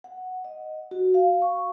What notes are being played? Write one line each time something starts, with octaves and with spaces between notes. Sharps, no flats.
F#5
D#5
F#4
F5
C#6